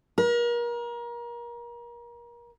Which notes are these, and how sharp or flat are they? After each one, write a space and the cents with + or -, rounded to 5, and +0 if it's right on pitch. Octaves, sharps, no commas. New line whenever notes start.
A#4 +30